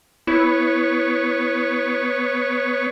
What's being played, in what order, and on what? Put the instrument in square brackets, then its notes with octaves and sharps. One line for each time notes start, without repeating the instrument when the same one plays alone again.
[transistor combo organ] B3 C#5 [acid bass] E4